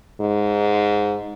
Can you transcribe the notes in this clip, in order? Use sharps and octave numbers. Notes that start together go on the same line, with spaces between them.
G#2